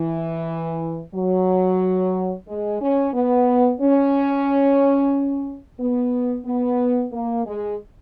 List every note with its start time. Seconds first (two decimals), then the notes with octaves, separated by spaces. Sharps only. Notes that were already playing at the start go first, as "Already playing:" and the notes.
Already playing: E3
1.14 F#3
2.47 G#3
2.81 C#4
3.14 B3
3.80 C#4
5.79 B3
6.46 B3
7.13 A#3
7.46 G#3